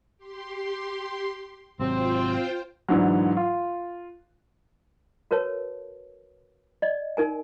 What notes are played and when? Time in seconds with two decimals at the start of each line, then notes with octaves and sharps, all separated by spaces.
0.18 G4 C6
1.80 G#1 C3 F#3 C4 F4 C5 G5
2.89 G#2 D3 E3 F#3
3.37 F4
5.31 F#4 A#4 B4 C#5 A5
6.82 D5 D#5
7.17 D#4 A#4 G#5